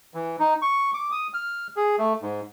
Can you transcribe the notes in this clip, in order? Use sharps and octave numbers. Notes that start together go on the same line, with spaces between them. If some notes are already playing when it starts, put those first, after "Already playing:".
E3
D#4
C#6
D6
D#6
F6
G#4
A3
G#2